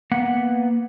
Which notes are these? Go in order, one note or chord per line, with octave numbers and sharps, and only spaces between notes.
A#3 B3 F#5